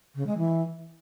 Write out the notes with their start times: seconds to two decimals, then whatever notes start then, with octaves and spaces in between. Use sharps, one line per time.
0.15 C#3
0.26 G#3
0.37 E3